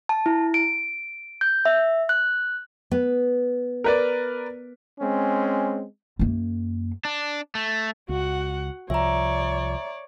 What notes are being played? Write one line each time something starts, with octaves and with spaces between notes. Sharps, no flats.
A5
E4
D7
G6
E5
F#6
B3
A#4 B4 D5
G#3 C4 C#4
F#2 A#3
D4
A3
C#2 F#4 F#5
C2 F3 C#5 D5 E5 A#5